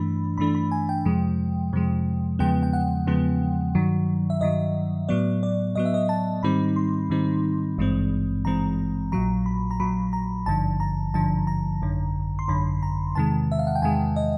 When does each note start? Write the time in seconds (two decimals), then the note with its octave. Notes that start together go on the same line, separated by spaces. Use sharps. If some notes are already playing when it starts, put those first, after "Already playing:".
Already playing: G2 E3 A3 D4 B5
0.38 G2 E3 A3 D4 B5
0.55 B5
0.72 G#5
0.89 G5
1.05 F2 C3 F3 G#3
1.73 F2 C3 F3 G#3
2.39 E2 C#3 F3 G#3 B3 G5
2.63 G5
2.73 F#5
3.07 E2 C#3 F3 G#3 B3
3.75 G2 D#3 F#3
4.30 E5
4.41 G2 D#3 F#3 D#5
5.09 A2 F#3 B3 D5
5.43 D5
5.75 A2 F#3 B3 D#5
5.85 E5
5.94 D#5
6.09 A5
6.43 G#2 D#3 G3 C4 D#4 B5
6.76 C6
7.10 G#2 D#3 G3 C4 D#4
7.78 G#1 G2 E3 G#3 C4
8.45 G#1 G2 E3 G#3 C4 A#5
9.12 A#1 A#2 F#3 A#5
9.46 B5
9.71 A#5
9.80 A#1 A#2 F#3 B5
10.13 A#5
10.46 G#1 G2 D3 F3 A5
10.80 A#5
11.14 G#1 G2 D3 F3 A5
11.47 A#5
11.82 G#1 F#2 D3
12.39 C6
12.48 G#1 F#2 D3 B5
12.83 A#5
13.15 E2 C3 D#3 G#3 A5
13.52 E5
13.59 F5
13.67 F#5
13.75 G5
13.82 E2 C3 D#3 G#3 G#5
14.16 D#5